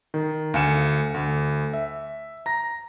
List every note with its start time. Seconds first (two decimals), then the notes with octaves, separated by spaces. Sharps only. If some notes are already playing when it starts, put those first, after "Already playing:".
0.14 D#3
0.54 D2 F5 G#5 C#7 E7
1.14 D2
1.74 E5
2.46 A#5 A#6